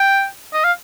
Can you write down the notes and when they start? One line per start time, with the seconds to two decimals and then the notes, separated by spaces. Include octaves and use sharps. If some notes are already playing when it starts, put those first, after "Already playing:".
Already playing: G5
0.53 D#5
0.64 F5